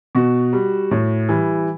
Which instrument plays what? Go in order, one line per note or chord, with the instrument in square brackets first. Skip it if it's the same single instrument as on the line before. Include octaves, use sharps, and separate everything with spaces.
[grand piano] B2 F#4
G3
A2
E3 G3